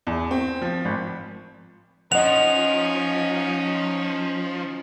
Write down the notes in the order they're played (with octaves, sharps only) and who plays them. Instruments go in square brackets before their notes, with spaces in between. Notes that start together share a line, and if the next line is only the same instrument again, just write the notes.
[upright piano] E2
C4
F3
G#1
[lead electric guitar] F3 [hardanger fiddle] C#4 D#4 [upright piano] D#5 F#5 [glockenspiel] F7